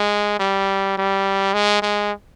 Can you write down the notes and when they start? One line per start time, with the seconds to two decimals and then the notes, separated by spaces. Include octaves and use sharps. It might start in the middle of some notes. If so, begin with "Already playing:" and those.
Already playing: G#3
0.40 G3
0.98 G3
1.54 G#3
1.82 G#3